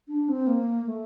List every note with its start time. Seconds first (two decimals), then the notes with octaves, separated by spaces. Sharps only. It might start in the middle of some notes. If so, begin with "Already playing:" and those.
0.08 D4
0.29 C4
0.47 A#3
0.87 A3